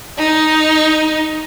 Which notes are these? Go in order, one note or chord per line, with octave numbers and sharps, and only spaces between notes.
D#4